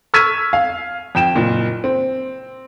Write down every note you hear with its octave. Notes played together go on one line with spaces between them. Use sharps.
C#6 E6 F6 G#6 B6 D#7
F5
F2 G5 E7
F#1 A#2
C4